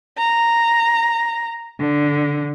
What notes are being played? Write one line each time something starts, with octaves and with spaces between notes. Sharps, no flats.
A#5
D3